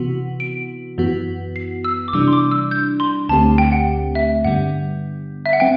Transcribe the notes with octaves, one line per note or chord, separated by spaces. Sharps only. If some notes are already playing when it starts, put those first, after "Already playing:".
Already playing: C3 E3 B3 F#4
D7
F#2 E3 B3 F#4
C7
E6
D6
C3 E3 G3 D4 E6
C6
D6
E6
G6
C6
D2 D3 A3 C4 G4 A5
G5
F#5
E5
G2 D3 G3 B3 F#5
E5
F#5
F#3 C4 G5